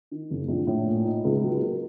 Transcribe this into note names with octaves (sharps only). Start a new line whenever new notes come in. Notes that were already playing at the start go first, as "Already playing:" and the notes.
D#3
F#1
A#1
A2
A#2
D#4
C#2
F#3
A#3